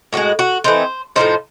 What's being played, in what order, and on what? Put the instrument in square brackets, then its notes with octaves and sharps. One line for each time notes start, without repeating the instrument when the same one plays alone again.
[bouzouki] A2 F3 G#3 F#4
F#4
E3 A3 C4 D#4 C5
A2 F3 A#3 D#4 C5